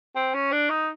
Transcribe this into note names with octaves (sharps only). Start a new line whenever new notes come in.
C4
C#4
D4
D#4